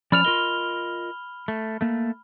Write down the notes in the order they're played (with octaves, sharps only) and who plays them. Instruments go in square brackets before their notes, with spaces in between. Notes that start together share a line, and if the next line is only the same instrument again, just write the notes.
[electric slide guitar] F3 C#4 D5 [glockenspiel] B5 F6 F7
[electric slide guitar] F4 A#4 D#5 [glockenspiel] G7
[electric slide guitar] A3
A3 A#3